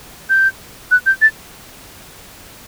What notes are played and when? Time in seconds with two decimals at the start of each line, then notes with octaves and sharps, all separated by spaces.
0.30 G6
0.91 F#6
1.06 G6
1.22 A6